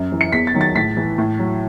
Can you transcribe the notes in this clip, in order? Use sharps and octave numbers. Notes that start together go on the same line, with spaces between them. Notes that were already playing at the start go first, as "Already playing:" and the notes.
Already playing: F#2
E3
C#7
E2 B6
A6
D#3 F#3
A6
A2 B6
E3
A2
F#3